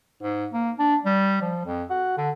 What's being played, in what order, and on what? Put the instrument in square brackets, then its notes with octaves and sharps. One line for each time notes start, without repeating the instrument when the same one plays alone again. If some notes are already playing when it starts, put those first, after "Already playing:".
[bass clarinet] G#2
A#3
D4
G3
F3
F2
F#4
D3